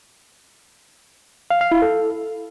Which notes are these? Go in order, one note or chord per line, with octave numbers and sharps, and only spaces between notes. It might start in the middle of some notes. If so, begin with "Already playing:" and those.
F5
F5
E4
A4